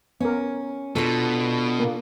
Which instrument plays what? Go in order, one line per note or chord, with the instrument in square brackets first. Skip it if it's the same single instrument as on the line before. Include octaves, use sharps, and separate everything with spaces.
[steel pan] B3 A#4 [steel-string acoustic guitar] C#4
[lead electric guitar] B2 [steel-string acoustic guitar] D4 F4 A4
[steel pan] A#3